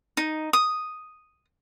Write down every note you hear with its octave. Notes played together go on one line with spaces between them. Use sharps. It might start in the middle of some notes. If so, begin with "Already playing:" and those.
D#4
D#6